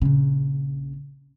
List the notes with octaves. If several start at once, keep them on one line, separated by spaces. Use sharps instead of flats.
A#1 C#3